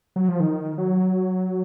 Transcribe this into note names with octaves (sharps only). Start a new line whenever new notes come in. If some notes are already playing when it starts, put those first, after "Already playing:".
F#3
F3
D#3
F#3